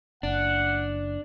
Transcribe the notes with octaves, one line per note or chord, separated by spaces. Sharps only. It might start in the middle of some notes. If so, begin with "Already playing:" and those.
F#1 D4 F#5